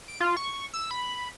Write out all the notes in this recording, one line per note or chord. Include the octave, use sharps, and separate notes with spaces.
D7
F4
C#6
E6
B5